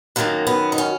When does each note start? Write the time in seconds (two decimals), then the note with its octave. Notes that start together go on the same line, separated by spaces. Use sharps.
0.16 F#2 D#3 F#3 A#3
0.47 B3
0.72 D#4
0.78 C#4